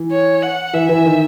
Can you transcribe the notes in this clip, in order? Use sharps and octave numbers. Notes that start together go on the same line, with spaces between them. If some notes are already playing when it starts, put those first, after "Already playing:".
Already playing: E3
C#5
F#5
E3 E5
E3
D#3